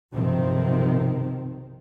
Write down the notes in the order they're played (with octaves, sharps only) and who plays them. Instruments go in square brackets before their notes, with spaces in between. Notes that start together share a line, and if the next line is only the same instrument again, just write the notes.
[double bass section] B1 G2 C3 D#3 F3 C4